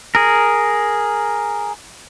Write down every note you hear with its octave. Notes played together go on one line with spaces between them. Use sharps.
G#4 A#4